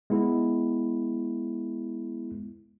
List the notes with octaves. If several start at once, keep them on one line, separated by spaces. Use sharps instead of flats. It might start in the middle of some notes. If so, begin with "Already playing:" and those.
G#3 B3 E4